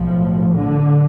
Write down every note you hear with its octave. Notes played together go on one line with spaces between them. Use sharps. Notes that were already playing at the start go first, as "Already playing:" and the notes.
Already playing: B1 A2 F3
D3